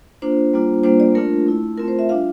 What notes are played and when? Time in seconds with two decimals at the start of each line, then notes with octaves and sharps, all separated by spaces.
0.22 A#3 D4 F4 C5
0.53 G3 A#3 D4 F4
0.84 G3 A#3 D4 F4 C5
1.00 D5
1.15 A3 D4 F4 A#4
1.47 A3 E4
1.78 A3 C4 F4 A#4
1.88 C5
1.99 E5
2.09 G3 D4 F4 F5